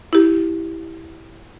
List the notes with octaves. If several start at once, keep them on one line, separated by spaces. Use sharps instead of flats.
E4 G4